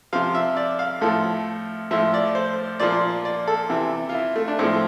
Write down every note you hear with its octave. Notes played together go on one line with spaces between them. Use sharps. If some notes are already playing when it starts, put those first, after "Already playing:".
C3 F3 F5
E5
D5
F5
A2 F3 A4
A2 F3 E5
D5
C5
A#2 F3 D5
D5
A4
C3 E3
F4
E4
A3
D4
A2 F3 C4